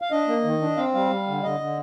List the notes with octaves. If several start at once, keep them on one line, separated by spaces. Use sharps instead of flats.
F5
D4 D#5
A#3
D#3
D4
C4 F5
G3 F5
G3
D3
D3 D#5
D3